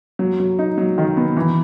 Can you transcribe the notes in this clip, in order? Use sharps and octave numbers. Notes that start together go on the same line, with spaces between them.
F#3
F#3
D#4
F#3
D#3
B3
E3